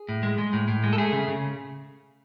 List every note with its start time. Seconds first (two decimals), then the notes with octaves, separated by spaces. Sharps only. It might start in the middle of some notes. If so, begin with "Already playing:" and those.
Already playing: G#4
0.09 A2
0.23 G#3
0.38 G#3
0.53 A2
0.68 A2
0.84 G#3
0.93 A4
0.98 A3 G#4
1.12 C#3
1.28 C#3